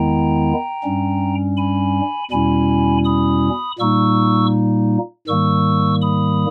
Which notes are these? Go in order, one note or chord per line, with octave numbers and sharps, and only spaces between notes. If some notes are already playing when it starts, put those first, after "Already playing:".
Already playing: E2 D#3 G#3 B3 E4 G5 A#5
G2 G3 C#4
G#5 B5
E2 B2 G3 C#4 E4 G#5 B5
B5 D#6
A#2 G3 A#3 D#4 C#6 E6
G#2 D#3 G3 A#3 C#6 E6
B5 D#6